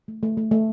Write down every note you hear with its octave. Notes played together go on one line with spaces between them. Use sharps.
A3
A3
A3
A3